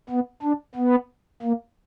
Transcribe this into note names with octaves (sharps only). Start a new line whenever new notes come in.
B3
D4
B3
A#3